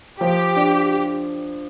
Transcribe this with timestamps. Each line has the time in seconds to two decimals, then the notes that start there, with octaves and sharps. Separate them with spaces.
0.20 F3 G4
0.56 D4